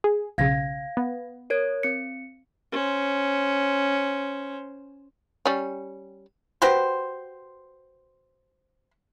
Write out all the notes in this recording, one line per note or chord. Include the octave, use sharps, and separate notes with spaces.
G#4
B1 C#3 F5 G#6 A#6
B3
A#4 C#5 G#6
C4 C#7
C#4 C5
G3 C#4
F#4 G4 B4 C5